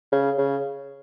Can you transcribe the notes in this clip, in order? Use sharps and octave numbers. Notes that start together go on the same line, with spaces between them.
C#3
C#3